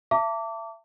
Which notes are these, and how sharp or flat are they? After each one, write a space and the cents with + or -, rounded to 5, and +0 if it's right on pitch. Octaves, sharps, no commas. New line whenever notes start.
E5 +30 A5 +35 D6 -25